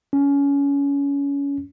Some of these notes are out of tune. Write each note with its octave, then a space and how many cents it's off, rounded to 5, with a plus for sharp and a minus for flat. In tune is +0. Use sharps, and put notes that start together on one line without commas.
C#4 +25